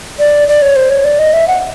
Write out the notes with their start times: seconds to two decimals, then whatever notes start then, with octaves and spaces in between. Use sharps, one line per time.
0.19 D5
0.48 D5
0.62 C#5
0.76 C5
0.90 C#5
1.04 D5
1.19 D#5
1.33 E5
1.48 F#5